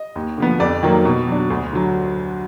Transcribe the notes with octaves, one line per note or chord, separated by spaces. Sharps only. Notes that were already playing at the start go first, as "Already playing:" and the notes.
Already playing: D#5
D#2
D3 F3 B3
F2 D5
D#3 F#3 A#3
B2
F#3 D4
D2
D3 F#3